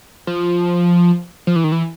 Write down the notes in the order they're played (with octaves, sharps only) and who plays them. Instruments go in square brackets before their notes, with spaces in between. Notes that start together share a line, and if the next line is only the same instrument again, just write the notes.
[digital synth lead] F3
F3
E3
D#3
E3